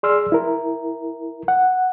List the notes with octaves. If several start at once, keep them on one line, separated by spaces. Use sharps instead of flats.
G#4 D5 C6 E6 F6
E4 A#4
F#5